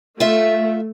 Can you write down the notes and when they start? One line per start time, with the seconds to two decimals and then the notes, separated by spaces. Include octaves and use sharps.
0.20 A3 F4 E5